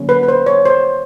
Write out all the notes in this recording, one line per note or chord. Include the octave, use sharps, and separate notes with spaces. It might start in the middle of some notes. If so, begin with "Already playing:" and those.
Already playing: D3 F#3 A#3 C#4
B4
B4
C5
C#5
C5